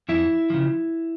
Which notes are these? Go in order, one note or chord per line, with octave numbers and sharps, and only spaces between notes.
F2 E4 E5
C#3 F3